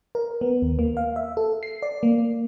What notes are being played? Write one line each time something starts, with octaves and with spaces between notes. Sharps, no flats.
A#4
B3
D#2
A#3
F5
E5
A4
C7
D5
A#3